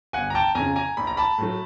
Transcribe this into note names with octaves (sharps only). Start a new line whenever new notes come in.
G1 F#5 G#5
A#5
G5 A5
F2 C#3 G#5 A#5
G#5 A#5
A#1 B5
A#5
A5 B5
A2 F#3 A3